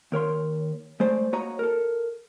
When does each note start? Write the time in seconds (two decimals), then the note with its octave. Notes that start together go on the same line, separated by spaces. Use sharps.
0.12 D#2 A#4 C#5 C6
1.00 G#3 A3 C5 D5
1.33 A#3 F#4 C#5 D#5 A#5
1.59 A4 A#4